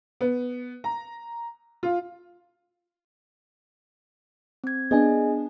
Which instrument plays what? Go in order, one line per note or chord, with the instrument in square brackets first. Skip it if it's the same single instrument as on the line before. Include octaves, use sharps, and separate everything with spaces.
[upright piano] B3
A#5
F4
[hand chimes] C4 G#6
[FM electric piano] B3 D4 [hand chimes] G#4 D#5 G#5